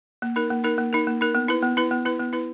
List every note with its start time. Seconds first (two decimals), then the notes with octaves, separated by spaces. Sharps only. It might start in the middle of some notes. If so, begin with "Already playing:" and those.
0.22 A#3
0.36 D#4 A#4
0.50 A#3
0.64 D#4 A#4
0.78 A#3
0.93 D#4 A#4
1.07 A#3
1.21 D#4 A#4
1.35 B3
1.48 E4 B4
1.62 B3
1.77 E4 B4
1.91 B3
2.05 E4 B4
2.20 B3
2.33 E4 B4